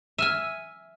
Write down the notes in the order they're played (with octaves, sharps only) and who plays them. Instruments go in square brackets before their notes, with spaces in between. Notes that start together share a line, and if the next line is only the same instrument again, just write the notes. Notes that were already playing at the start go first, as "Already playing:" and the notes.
[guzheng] E5 G#5 [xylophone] E6 F6 D#7